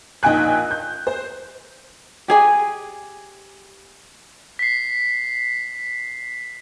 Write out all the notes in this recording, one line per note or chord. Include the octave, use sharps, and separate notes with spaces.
A#1 D#4 G5 G#5 F#6
G6
C5
G4 G#4 G#5
B6 C7